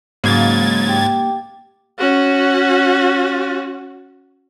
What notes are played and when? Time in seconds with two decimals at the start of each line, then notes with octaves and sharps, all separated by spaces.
0.24 G#2 C#3 F#3 A#3 G#6 A6
0.89 G4
1.99 C#4 F#4